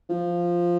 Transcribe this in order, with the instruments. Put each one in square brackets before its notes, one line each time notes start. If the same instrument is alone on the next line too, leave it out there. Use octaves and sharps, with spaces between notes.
[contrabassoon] F3